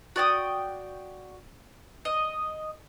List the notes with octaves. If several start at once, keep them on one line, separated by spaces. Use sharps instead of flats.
F#4 D5 G5 D#6
D#5